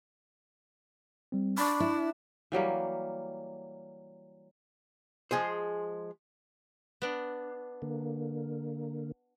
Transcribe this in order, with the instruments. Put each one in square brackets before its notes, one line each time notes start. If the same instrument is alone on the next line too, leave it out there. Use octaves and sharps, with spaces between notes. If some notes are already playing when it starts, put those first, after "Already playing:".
[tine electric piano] G3 C4
[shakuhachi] D4 [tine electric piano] B5 C#6
[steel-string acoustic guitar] E4
[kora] E3 F#3 G3 A#3
[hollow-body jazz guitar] F3 G#3 G#4 C5
[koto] B3 D4
[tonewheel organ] D3 A#3